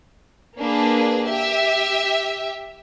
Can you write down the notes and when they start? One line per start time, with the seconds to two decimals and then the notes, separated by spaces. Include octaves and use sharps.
0.60 A#3 D4 G#4 B4
1.28 G4 E5